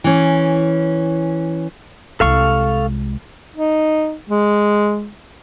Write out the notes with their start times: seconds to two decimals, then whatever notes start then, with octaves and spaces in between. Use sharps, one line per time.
0.04 E3 C#4
2.20 C2 G#3 A4 F5 C#6
3.56 D#4
4.29 G#3